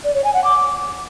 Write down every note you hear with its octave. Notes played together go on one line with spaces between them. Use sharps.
D5
C#5
G#5
F#5
D6